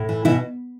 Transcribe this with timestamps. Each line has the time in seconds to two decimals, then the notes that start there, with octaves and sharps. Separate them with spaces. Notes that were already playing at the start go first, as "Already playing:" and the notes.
Already playing: A2
0.09 E3
0.25 B2 E3 E4